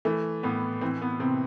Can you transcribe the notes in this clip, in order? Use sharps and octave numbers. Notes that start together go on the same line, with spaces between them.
E3 A3
A2 B3
E3 C4
B3
C3 C4